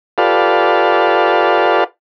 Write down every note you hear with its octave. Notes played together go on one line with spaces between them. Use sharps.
F4 G4 A4 B4 D5 F5